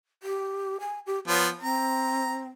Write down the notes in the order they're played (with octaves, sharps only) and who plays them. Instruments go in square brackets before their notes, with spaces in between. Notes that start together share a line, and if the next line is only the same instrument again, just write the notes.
[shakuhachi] G4
G#5
G4
[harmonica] F3 B3 [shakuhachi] C#5
[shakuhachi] C4 [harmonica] A#5